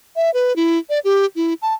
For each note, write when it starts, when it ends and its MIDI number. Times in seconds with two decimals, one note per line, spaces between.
0.16 0.30 76
0.34 0.55 71
0.56 0.78 64
0.90 0.99 74
1.04 1.26 67
1.36 1.54 64
1.62 1.74 81